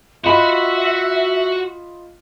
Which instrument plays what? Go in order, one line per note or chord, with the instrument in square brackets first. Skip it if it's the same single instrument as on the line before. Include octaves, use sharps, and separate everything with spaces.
[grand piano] F4 D#5 B5 [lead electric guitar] F#4 F#5 [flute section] E5